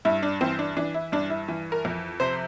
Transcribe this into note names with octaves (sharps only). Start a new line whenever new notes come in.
G2 E4
D4
E3 C4
D4
E3 D4
E4
G2 D4
E4
E3
A#4
F2
C3 C5